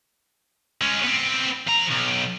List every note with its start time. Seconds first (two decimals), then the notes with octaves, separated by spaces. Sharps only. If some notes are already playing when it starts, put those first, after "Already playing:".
0.82 G#3 C#4
1.04 B3 C4
1.68 F3 A#5
1.91 B1